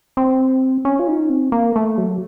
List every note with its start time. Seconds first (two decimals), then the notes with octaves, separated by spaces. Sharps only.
0.17 C4
0.85 C#4
0.99 F4
1.08 D#4
1.30 C4
1.52 A#3
1.76 A3
1.98 F#3